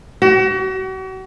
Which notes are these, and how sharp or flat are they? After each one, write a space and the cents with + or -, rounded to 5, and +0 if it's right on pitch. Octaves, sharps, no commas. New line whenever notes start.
F#4 +40